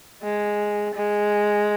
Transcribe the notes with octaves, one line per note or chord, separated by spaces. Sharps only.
G#3
G#3